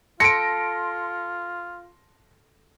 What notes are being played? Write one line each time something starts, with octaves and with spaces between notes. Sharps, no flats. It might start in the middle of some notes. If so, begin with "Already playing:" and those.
F4 A4 C6 A#6 C#7 D7